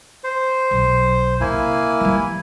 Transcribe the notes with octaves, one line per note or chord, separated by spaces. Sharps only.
C5
B1
C3 A#3 E4 G#5
E3 G3